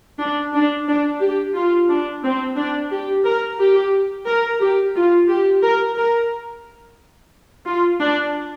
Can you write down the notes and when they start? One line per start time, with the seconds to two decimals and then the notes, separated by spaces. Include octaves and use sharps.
0.19 D4
0.54 D4
0.88 D4
1.21 G4
1.55 F4
1.88 D4
2.23 C4
2.57 D4
2.91 G4
3.25 A#4
3.58 G4
4.27 A#4
4.60 G4
4.95 F4
5.29 G4
5.62 A#4
5.96 A#4
7.66 F4
8.01 D4